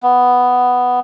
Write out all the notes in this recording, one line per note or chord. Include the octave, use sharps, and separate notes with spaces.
B3